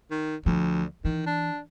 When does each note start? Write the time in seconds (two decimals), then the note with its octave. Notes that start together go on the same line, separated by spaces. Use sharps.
0.11 D#3
0.46 D2 F3
1.05 D#3 E3
1.26 D4